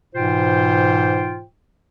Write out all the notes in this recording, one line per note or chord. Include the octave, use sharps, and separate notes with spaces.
G#2 B2 E3 F4 C5 G5